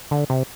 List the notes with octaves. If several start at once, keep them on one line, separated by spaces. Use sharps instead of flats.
D3
C3